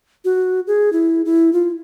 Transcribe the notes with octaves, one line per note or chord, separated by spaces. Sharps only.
F#4
G#4
E4
E4
F4